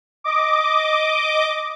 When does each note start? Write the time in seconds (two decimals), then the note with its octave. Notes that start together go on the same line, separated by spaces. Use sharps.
0.24 D#5 D6